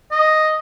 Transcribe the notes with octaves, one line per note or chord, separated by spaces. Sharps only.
D#5